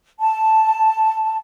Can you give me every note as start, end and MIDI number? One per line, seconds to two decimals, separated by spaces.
0.19 1.37 81